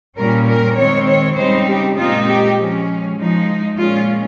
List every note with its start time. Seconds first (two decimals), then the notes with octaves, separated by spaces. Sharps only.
0.17 A#2 G3 C#4 A#4
0.46 A#4
0.76 D#3 G#3 C4 C#5
1.07 C#5
1.36 C#3 G3 C4 D#4 C5
1.67 G4
1.96 A#2 G#3 C4 D#4 F4
2.27 G4
2.57 F3 G#3 C#4
3.16 F3 G#3 D#4
3.77 A#2 G#3 C#4 F4